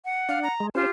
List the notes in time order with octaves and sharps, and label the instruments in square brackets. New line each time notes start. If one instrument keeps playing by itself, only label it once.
[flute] F#5
[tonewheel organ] D4 [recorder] F5
[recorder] A#5
[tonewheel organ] G#3
[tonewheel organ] C#4 C5 [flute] F4 [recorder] G4